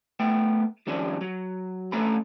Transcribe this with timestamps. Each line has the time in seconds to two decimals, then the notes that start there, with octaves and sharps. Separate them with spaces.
0.20 A3 B3 G5
0.87 D#3 F3 G3 C#4 D4
1.21 F#3
1.92 D3 A3 C#4 A4 A#5 B5